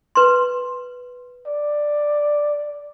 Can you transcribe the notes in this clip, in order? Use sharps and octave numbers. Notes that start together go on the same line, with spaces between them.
B4 C6
D5